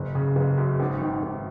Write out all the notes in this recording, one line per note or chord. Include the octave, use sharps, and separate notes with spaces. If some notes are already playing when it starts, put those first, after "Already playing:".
Already playing: F#1
C#3
F#1
F#2
G#1
D#3
G#1